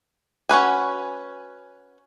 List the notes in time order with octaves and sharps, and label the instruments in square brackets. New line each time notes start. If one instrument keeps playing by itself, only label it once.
[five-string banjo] C#4 F#4 B4 G#5